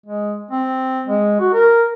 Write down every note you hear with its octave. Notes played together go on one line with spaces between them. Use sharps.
G#3
C4
G#3
F#4
A#4